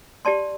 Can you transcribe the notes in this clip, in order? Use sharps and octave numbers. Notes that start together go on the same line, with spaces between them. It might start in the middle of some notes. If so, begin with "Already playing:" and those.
G4 D5 A5 C6